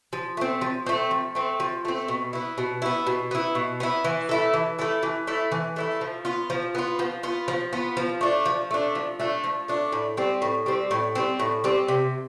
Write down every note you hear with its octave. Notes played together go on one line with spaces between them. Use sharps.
F3
A3 C4
F3
A3 C4
F3
A3 C4
F3
A3 C4
B2
B3 E4
B2
B3 E4
B2
B3 E4
B2
B3 E4
E3
A3 E4 A4
E3
A3 E4 A4
E3
A3 E4 A4
E3
A3 E4 A4
F3
B3 F4
F3
B3 F4
F3
B3 F4
F3
B3 F4
F3
A3 D4
F3
A3 D4
F3
A3 D4
F3
A3 D4
A2
G3 C4
A2
G3 C4
A2
G3 C4
A2
G3 C4
C3